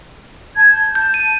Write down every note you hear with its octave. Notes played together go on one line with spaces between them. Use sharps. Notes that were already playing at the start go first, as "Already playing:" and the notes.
A5 G#6
G6
A5 G6
D#7